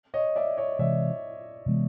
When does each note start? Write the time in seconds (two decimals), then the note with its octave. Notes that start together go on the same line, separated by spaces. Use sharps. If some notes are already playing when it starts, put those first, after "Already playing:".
0.14 C#5 D#5
0.36 D5 E5
0.57 C#5 D#5
0.79 C3 E3 G#3 D5 E5
1.66 C3 E3 G#3 B3